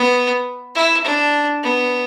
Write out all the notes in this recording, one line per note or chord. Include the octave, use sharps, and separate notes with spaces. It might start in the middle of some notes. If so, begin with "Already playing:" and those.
Already playing: B3
E4
D4
B3